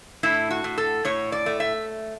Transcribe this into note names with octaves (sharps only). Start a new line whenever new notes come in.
A2 E4
F#4
A2
A4
A2 C#5
D5
A3
E5